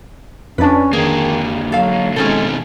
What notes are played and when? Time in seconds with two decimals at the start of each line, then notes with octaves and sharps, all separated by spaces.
0.58 F2 C#4 D4 B4 D5
0.93 D3 D#3 A#3 G#4
1.72 F#3 A4 F5
2.16 B2 D#3 G#3 C4 C#4 G#4 A4